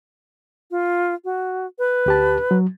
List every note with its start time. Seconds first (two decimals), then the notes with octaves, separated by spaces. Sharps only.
0.71 F4
1.24 F#4
1.79 B4
2.06 D2 G4 A5
2.51 F#3